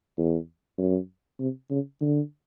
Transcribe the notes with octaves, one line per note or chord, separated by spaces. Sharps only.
E2
F#2
C3
C#3
D3